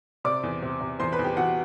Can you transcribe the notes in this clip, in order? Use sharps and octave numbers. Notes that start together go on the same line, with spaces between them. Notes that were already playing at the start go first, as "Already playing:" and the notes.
C3 D5 D6
E2
C3
C3
E2 C5 C6
B4 B5
E2
G4 G5
E2 F#4 F#5